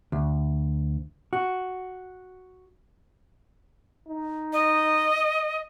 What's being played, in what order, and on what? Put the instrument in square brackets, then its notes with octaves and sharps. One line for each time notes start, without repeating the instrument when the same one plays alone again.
[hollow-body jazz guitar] D2
F#4
[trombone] D#4
[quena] D#5